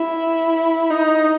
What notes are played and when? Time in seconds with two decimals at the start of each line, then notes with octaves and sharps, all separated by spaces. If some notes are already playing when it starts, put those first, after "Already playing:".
Already playing: E4
0.91 D#4